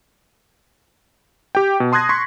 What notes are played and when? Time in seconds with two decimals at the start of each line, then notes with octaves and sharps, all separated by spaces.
1.55 G4 G5
1.80 B2
1.92 A5 C6 D#6 F#6 G#6 A#6
2.09 C6 C#6 B6